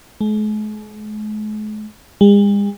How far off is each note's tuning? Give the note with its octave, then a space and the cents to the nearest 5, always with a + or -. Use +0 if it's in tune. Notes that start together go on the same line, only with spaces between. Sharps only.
G#3 +45
G#3 -45